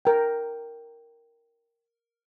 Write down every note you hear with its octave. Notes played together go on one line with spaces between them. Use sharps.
A#4 G5